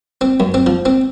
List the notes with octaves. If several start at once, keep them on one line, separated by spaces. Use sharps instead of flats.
C4
F#2
C4
F3
C4